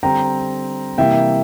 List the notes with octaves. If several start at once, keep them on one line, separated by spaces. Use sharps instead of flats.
D3 G3 C4 G5 A#5
C3 E3 G3 A#3 E5 G5